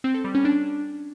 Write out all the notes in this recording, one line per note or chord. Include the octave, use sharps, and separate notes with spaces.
C4
A4
G3
C#4
D4